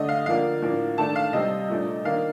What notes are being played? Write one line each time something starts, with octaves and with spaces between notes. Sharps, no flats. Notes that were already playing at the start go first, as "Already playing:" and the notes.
Already playing: D3 A3 D4 D#5
F5
D3 F3 A#3 D4 F5
A2 F3 A#3 D4
D#3 A3 D4 A5
F5
C3 G3 C4 D#5
A#2 A3 D4
D#3 A#3 D4 F5